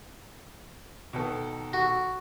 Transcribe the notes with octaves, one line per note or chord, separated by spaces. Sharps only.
B2 D#3 A4
F#4